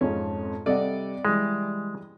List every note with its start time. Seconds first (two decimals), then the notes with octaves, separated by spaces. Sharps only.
0.01 F2 G#2 C#4 F4
0.66 C3 G3 A4 D5 D#5 F#5
1.25 E3 G3 G#3